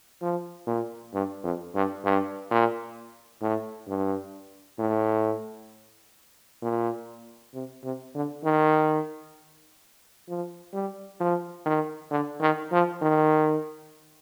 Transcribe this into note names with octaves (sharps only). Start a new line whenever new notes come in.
F3
A#2
G2
F2
G2
G2
A#2
A2
G2
A2
A#2
C3
C3
D3
D#3
F3
G3
F3
D#3
D3
D#3
F3
D#3